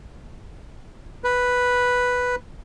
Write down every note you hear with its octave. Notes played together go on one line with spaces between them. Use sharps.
B4